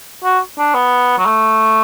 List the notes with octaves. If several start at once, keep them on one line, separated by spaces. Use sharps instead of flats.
F#4
D4
B3
F#3
A3